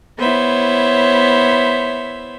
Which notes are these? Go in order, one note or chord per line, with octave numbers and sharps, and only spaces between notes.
B3 E4 C5 C#5 E5